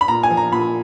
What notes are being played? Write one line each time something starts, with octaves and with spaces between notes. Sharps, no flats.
B5
A#2 A#5
G#5
F3
A#5
A#2 B5